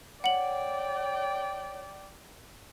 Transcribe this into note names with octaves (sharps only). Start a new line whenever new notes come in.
C#5 D5 F#5 G5 F#7